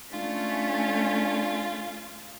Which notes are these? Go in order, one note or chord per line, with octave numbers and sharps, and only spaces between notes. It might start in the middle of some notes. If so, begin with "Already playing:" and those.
A3 C#4 D4 F4